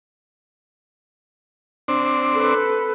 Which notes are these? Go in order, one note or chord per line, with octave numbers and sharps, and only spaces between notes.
C4 D4
A4 B4